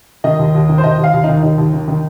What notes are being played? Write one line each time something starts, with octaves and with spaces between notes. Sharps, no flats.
D#3 D#5
D#2
D#2
D#3
C5
D#2 D#5
D#2
F5
D#2
D#3 D#4
D#2 D#4
D#2
D#3
D#3